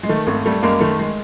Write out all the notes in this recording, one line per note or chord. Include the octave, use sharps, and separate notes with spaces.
G#3
D#3 A3
G#1 A3
G3 A3
F#2 G#3 A#3
D#3 A3
G#3